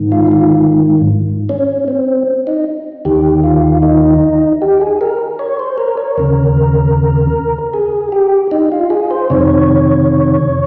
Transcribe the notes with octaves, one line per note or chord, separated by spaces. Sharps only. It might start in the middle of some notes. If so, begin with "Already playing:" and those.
Already playing: G#2 D#3
F4
F4
C#4
C4
D#4
D#2 D#3 G4
F4
D#4
G4
G#4
A#4
C#5
C5
A#4
C#5
D#2 C#3 A#4
G#4
G4
D#4
F4
G#4
C5
F2 C3 D#3 C#5